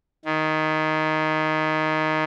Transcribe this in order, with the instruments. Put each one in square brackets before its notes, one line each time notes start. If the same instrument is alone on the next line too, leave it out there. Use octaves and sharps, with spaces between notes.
[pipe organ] D#3